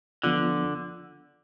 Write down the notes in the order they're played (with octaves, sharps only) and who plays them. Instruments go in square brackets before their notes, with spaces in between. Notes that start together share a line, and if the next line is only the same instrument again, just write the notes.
[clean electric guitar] D3 [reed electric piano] F3 B3 F4